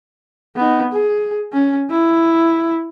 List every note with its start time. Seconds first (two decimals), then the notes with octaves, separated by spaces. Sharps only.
0.56 B3 D#4
0.92 G#4
1.53 C#4
1.90 E4